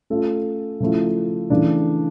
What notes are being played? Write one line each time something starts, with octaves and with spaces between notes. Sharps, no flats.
A3 C#4 F4 A4
C#3 F3 A3 E4
C#3 E3 A3 D4